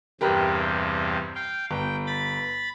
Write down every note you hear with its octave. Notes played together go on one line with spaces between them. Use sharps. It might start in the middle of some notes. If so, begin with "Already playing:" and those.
E2 G2 C3 G4 A#4 B4
F5 G5
G1 G5
B5 A6